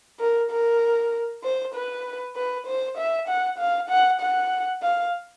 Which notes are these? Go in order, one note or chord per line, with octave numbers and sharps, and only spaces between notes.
A#4
A#4
C5
B4
B4
C5
E5
F#5
F5
F#5
F#5
F5